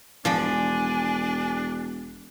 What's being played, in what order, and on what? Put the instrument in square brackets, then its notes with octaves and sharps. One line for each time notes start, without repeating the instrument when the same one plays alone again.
[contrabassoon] E1 [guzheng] F3 D5 B5 [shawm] D4 [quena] G#5